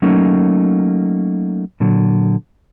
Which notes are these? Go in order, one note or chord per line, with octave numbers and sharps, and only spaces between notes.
F#3 A3 A#3 C#4 D#4
A#2 D3 F#3